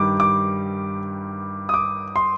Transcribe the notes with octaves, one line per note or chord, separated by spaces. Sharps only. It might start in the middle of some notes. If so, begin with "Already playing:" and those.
Already playing: G2 D#3 G3 D6
D6
D#6
D6
C6